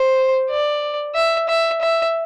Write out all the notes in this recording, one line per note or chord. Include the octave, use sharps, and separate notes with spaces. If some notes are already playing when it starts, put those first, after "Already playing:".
Already playing: C5
D5
E5
E5
E5